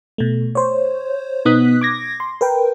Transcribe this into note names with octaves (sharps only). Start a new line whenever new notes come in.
B2 A3
C5 C#5
B2 B3 D#4 D#6 F#6 B6
D6 G#6 A#6
C6
A#4 B4 G5